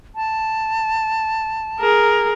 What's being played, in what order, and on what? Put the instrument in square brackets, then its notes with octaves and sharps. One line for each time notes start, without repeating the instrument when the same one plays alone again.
[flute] A5
[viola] G#4 A#4